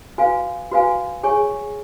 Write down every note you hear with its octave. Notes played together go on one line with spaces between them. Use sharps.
F#4 B4 F5 G#5
F#4 B4 F5 G#5
G#4 C#5 G#5 C#6